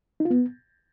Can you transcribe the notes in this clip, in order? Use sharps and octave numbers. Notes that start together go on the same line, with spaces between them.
D#4
F4
B3